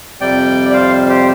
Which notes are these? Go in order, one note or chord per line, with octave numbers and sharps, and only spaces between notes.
F2 C3 G3 D5 G5
D5
C5 F5
G4 C5